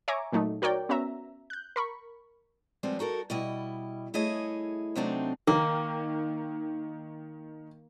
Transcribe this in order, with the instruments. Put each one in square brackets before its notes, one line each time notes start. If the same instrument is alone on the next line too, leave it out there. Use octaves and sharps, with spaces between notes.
[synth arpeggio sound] C#5 E5 G#5 A#5 C#6 D6
A#2 F#3 A3 D#4
F#4 A#4 C#5 D5 G5
B3 C#4 F#4 E5 A#5
F#6 G6
A#4 B5 C#6
[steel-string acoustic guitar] F3 G3 G#3 B3 C4
D#4 F#4 A4 A#4
B2 G3 E4 D#5
A3 E4 G#4 C#5 D#5
C3 F#3 A3 C4 D4 D#4
[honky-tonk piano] D#3 [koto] A#3